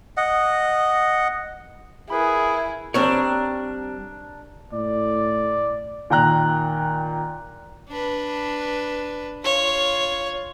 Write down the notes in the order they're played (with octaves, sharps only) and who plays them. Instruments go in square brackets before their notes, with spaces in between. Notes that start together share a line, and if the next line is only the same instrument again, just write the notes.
[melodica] D#5 F#5
[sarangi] E4 [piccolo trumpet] G#4 [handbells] A#4 B4 B5
[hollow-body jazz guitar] G3 C4 C#5 [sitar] D4 A#4
[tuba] A2 [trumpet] D5
[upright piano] A#2 D#3 G5 A#5 F#6
[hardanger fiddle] D4 B4
[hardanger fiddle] F4 [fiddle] C#5